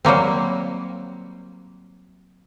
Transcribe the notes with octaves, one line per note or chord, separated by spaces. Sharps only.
F#3 G3 A#3 C4